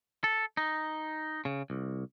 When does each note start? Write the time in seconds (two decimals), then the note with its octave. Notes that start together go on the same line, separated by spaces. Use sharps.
0.24 A4
0.57 D#4
1.45 C#3
1.70 C2